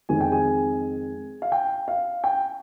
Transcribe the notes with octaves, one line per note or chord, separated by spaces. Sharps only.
F2 D#3 G#3 C4 G#5
G5
G#4 G#5
F5
G5
F5
G5